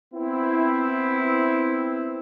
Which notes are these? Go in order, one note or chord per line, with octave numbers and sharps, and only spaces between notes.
B3 C4 E4